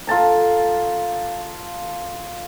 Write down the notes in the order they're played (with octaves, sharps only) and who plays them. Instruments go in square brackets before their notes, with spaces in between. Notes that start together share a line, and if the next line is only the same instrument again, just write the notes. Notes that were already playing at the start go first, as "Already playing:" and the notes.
[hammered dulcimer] F4 A4 A5 A#5